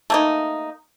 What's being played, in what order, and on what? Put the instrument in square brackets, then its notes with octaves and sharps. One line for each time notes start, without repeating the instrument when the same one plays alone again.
[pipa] A3 A#3 D#4